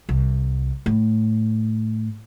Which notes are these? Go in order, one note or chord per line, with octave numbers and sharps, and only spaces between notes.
C2
A2